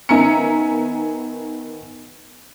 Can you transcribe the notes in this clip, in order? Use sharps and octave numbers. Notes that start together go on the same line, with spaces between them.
D#3 B3 E5 G#5 A#5 C#7